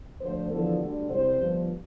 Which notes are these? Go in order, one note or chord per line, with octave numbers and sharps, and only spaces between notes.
D2 D3 F3 C5
E2 D3 F3 A4
D2 D3 G3
C2 C3 G3 C5
G1 G2 F3